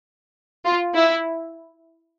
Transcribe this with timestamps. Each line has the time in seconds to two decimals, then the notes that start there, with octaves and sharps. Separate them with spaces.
0.65 F4
0.95 E4